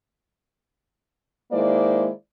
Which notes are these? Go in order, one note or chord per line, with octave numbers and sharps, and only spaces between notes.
D#3 G#3 A#3 E4 C5 D5